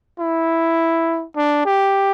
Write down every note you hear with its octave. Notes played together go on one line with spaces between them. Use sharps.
E4
D4
G4